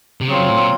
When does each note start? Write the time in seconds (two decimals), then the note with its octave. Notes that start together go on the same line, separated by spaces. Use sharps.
0.21 C3
0.28 C#3 F#3 C4 F4
0.39 F#2
0.48 A2
0.57 A#2